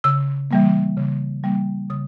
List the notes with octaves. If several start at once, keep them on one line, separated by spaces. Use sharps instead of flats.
C#3 E6
E3 G3 A#3
C#3
E3 G3 A#3
C#3 D#6